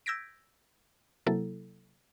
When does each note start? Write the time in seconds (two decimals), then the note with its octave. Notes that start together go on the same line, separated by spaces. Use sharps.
0.06 E6 G6 G#6 A#6 B6 D7
1.26 C3 F#3 A#3 E4 A4